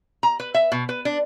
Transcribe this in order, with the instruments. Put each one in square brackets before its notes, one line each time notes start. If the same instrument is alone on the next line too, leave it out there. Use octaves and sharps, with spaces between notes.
[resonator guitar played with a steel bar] A#5
B4
E5
B2
B4
D4